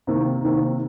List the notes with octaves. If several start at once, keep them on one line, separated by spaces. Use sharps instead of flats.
C3 D#3 A#3
C3 D#3 A#3